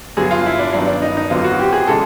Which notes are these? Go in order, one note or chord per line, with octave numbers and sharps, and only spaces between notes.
G2 D3 F#3 B3 G#4
F4
E4
D4
G2 D#3 F#3 B3 D4
D4
D#4
D#4
F2 D3 F#3 B3 F4
F#4
G4
G#4
C#3 E3 G#3 A4